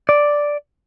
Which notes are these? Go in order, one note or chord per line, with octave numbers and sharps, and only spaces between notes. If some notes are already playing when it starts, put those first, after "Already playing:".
D5